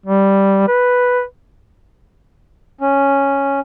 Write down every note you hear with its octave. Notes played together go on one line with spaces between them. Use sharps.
G3
B4
C#4